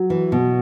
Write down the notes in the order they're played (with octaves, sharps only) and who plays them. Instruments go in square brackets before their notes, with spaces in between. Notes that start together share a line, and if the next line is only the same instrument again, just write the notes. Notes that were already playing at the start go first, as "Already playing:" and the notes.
Already playing: [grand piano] F#3
[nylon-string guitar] E3
B2